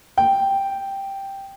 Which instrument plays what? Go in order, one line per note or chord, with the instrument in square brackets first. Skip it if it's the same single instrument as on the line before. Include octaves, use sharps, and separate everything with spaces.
[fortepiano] G5